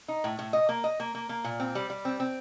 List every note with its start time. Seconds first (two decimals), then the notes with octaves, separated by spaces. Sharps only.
0.08 D#4
0.24 A2
0.39 A2
0.53 D#5
0.69 A#3
0.84 D#5
1.00 A#3
1.15 A#3
1.29 A#3
1.44 A#2
1.60 C4
1.75 G3
1.90 G3
2.05 C4
2.20 C4